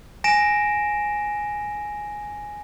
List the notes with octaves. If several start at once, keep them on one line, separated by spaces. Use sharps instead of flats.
G#5 A#6 D7 E7